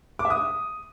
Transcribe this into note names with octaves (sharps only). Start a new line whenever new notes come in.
D6
E5
D#6